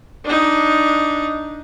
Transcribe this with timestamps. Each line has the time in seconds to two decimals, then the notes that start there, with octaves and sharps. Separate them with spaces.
0.25 D4 D#4